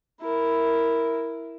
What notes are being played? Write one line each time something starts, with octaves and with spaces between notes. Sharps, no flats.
E4 A#4